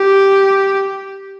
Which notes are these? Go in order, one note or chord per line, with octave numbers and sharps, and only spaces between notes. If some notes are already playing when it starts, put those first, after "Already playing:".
Already playing: G4